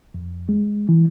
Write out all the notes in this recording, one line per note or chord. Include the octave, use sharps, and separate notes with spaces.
F2
G#3
E3